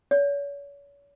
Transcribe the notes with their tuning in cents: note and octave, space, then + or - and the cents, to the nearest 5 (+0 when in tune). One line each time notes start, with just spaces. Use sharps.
C#5 +40